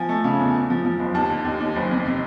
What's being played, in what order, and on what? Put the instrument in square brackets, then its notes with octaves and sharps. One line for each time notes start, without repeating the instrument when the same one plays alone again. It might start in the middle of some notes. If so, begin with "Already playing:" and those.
Already playing: [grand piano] F3 G#5
A3
C#3
E2
E2
F3
F3
F#1
D#2 A5
D3
D#2
D#2
F#1
F2
C3